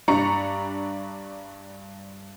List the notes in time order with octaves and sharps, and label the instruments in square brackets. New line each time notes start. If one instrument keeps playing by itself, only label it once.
[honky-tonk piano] G2 G3 D4 A#5 C#6 C#7